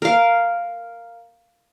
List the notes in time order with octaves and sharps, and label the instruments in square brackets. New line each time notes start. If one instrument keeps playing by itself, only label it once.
[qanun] A#4 F5